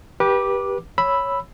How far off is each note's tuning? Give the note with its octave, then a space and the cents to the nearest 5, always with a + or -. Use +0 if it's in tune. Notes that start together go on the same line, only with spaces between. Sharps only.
G4 +0 B4 -30 D6 +0
C#5 +0 B5 +0 E6 +0